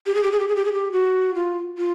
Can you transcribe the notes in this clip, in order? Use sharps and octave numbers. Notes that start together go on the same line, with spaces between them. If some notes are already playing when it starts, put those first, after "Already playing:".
G4
G#4
G4
G#4
G4
G#4
G4
G#4
G4
F#4
F4
F4